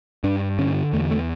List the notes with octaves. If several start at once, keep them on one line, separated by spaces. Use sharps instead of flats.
G2 D4
D3 C#4
E2 A3
A3